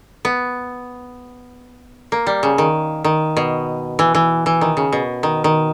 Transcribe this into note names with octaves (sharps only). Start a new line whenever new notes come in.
B3
A#3
G3
C#3
D#3
D#3
B2
E3
E3
E3
D#3
C#3
B2
D#3
D#3